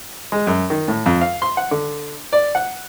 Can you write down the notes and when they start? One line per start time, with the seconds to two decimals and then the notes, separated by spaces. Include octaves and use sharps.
0.32 G#3
0.47 F#2
0.70 D#3
0.88 A2
1.06 F2
1.21 F5
1.42 C6
1.57 F#5
1.71 D3
2.32 D5
2.55 F#5